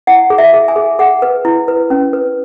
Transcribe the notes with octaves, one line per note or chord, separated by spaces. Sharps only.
E4 F#5
G#4
E5
G#4
G#5
G#4
G#4 F#5
B4
E4
B4
C#4
B4